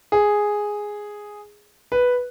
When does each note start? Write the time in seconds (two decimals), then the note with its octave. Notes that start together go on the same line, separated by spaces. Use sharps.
0.12 G#4
1.92 B4